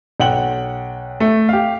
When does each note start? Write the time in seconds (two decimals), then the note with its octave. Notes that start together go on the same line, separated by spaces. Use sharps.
0.20 B1 F#5 G5 F#7
1.20 A3
1.49 G4 F5